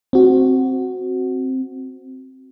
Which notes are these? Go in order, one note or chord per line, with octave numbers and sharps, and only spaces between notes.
C4 F#4